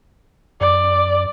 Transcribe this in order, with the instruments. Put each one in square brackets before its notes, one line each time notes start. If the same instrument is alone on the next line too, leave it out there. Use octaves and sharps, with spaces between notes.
[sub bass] F#2 [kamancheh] D5